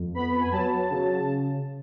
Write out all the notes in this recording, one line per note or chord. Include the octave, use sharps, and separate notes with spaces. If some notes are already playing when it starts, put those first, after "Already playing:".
Already playing: F2
B3 B5
G#5
F#3 A5
C#3